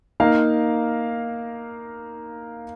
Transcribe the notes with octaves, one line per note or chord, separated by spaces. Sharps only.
A#3 D#4 A#4 F5